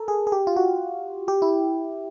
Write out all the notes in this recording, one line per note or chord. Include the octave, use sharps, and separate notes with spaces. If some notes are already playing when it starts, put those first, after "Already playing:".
Already playing: A4 A#4
G#4
G#4
G4
F4
F#4
G4
E4